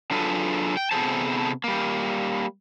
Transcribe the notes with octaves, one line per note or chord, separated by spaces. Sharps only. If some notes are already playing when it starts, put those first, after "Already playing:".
F#3 D4 F4 G#4 A4 B4
G5
C3 B3 G#4 A4 C5 A5
G3 A#3